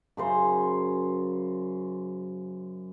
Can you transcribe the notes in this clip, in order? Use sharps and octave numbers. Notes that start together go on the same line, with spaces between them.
F#2 C#3 C5